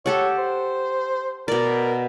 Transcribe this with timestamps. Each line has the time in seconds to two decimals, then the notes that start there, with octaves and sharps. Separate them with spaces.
0.06 G4 A4 C#5 F#5
0.38 C5
1.48 B2 A#4 D5